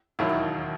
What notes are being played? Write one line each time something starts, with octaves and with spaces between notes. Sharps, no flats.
E1 D#2 D#3 F#3 E4
D#4